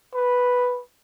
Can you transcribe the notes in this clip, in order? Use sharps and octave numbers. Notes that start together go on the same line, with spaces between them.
B4